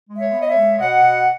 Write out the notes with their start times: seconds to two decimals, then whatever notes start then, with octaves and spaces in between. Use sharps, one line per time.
0.09 G#3
0.17 C#5 E5
0.32 B3
0.41 D#5
0.48 C#5 E5
0.55 G#3
0.79 B2 D#5 F#5
1.03 B2